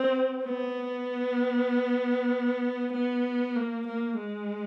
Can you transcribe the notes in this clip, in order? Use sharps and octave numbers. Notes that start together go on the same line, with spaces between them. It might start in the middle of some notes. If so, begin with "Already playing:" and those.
Already playing: C4
B3
B3
A#3
A#3
G#3